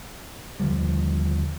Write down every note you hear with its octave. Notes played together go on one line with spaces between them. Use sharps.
D#2 D3 F3 G3